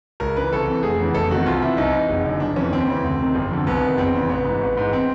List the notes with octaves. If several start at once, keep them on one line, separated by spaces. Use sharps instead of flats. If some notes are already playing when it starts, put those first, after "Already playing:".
C#2 A#4
C#3 E3 B4
C2 A4
C3 E3
F1 G#4
E2 C#3 E3
F1 A4
E2 C3 D#3 F#4
C2 F4
C3 E3 E4
C2 D#4
C3 E3
F#1
F#2 D3
G1 D4
F2 C3 E3 C#4
D#2 C4
C#3 E3
D2
C3 D#3
G1
F2 D3
C2 B3
C3 D#3
F#1 C4
E2 C#3 E3
A1 B3
G#2 E3
A1
G#2 E3
C4